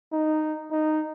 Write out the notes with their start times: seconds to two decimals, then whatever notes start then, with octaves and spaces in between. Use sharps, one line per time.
0.12 D#4
0.71 D#4